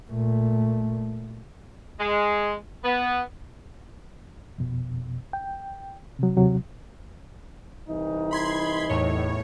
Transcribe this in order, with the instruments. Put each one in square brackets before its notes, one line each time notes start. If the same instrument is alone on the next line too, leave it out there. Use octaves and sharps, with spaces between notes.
[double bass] A#2 A3
[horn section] G#3
B3
[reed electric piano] F2 B2
G5
C3 F#3
D#2 C3 F#3
[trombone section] C2 E3 D#4
[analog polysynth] B5 C6 G#6
E2 A2 C#5